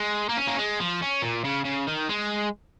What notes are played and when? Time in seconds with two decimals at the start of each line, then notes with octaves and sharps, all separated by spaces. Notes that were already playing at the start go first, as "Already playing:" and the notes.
Already playing: G#3
0.29 A#3
0.37 C#4
0.48 A#3
0.59 G#3
0.80 F3
1.02 C#4
1.22 A#2
1.45 C#3
1.65 C#3
1.87 D#3
2.09 G#3